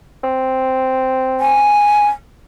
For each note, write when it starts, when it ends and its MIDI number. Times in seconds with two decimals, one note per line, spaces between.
0.24 1.80 60
1.40 2.08 80